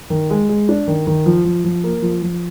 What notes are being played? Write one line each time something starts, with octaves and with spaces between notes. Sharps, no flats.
D#3
G#3
G#3
D4
D#3
D#3
F3
F3
F3
A#3
F3
F3